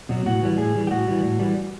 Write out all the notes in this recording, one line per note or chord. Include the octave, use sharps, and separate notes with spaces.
B2 F#3
A2 F#4
E3 G3
A2 G#4
E3 G3
G4
A2 F#4
E3 G3
A2
E3 G3